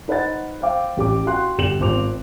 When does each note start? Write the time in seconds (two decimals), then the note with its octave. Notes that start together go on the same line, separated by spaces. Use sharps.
0.08 D#4 B4 C5 F#5 A6
0.61 C5 E5 F5 G5 D6
0.97 A1 G4 D6
1.26 F#4 F5 G5 C6 F#6
1.58 G1 G4 E7 F#7
1.80 G#1 C4 F4 D6 F7